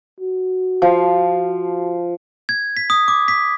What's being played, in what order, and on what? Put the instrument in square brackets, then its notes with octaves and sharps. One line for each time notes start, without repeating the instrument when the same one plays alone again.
[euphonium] F#4
[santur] F3 F5
[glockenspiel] G#6
B6
D#6
D6
B6